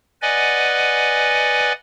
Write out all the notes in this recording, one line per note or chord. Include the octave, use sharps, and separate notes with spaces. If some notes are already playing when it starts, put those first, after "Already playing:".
B4 D5 D#5 F#5 G#5